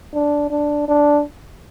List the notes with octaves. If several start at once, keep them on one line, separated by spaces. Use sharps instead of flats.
D4
D4
D4